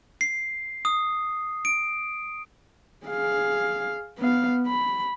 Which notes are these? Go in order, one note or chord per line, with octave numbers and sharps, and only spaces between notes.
C7
D#6
D7
G#4 F5
B3 F5
B5